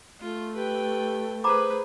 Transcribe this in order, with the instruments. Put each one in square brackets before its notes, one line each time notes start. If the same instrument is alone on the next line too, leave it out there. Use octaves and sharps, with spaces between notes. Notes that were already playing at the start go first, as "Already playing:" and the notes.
[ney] A3 [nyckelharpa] F4
[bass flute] G4 [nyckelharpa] B4 G5
[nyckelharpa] G#4 B4 [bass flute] C5 [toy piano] A#5 B5 D6